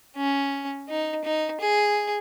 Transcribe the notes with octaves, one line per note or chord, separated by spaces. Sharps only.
C#4
D#4
D#4
G#4